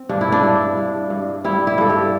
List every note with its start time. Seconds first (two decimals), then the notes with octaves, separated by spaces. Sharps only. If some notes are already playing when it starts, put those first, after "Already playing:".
Already playing: C4
0.09 G2 D4
0.21 E4
0.32 D4
0.43 G2
0.77 G2
1.10 G2
1.44 G3 E4
1.67 E4
1.78 G2 A4
1.90 G4